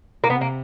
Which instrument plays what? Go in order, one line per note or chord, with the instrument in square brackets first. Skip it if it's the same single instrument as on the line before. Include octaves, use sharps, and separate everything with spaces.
[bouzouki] A#3
[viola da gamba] C3 [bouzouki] B3
[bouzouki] A#3